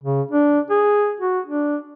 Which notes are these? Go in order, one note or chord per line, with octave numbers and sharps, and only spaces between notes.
C#3
D4
G#4
F#4
D4